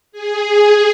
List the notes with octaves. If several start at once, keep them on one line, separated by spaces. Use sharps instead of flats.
G#4